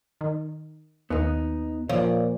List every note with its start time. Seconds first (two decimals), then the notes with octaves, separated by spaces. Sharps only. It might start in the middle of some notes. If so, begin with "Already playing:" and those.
0.21 D#3
1.10 D#2 B3 D#4
1.89 A#2 F3 C#5 D5